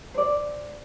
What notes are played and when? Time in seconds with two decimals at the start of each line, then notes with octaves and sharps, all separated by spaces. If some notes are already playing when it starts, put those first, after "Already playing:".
0.14 C5 D5